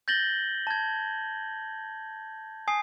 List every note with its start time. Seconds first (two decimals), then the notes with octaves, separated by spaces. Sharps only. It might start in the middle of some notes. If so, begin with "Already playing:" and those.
0.08 G6 A6 A#6 F#7 G7
0.67 A5 G#6
2.68 G#5 D#6 C7